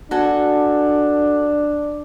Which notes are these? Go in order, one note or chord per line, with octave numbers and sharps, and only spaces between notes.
D4 F#4 A4 G#5